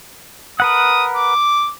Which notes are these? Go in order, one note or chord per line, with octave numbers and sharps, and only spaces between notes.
A#4 B4 F#5 D#6
D6